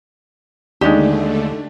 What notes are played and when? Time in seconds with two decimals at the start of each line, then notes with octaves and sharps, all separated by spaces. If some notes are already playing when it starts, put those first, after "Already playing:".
0.81 D#2 D3 G#3 A3 D4 D#4 G4